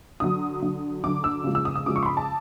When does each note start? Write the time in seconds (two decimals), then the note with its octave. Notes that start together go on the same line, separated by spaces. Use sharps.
0.20 D3 F#3 D#6
0.62 D3 F#3
1.04 D3 F#3 D6
1.24 E6
1.44 C#3 F3 G#3
1.55 E6
1.65 D#6
1.76 D#6
1.86 C#3 F3 G#3 D6
1.96 C#6
2.03 C6
2.06 B5
2.17 A5